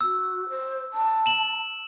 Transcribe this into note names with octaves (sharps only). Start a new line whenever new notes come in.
F#4 E6
C5
A5
E7 F#7